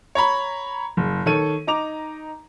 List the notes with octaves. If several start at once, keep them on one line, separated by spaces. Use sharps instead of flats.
C#5 A#5 B5
F#1
D#3 A4 C#5 D#7
D#4 A#5 D6 F7